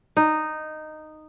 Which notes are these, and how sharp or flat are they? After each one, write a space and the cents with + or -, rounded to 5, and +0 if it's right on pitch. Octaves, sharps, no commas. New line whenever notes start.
D#4 -10